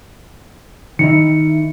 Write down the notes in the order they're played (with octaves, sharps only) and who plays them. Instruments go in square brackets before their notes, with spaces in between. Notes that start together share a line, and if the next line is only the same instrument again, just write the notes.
[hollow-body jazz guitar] D#3 D#4 E4 [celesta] C#7